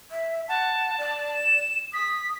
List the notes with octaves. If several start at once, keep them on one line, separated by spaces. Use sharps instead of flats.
E5
F#5 A5
D5
E7
D#6 B6